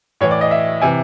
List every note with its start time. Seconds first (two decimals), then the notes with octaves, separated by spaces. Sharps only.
0.21 A2 E3 C#5
0.31 D5
0.41 D#5
0.51 E5
0.82 C3 E3 G#5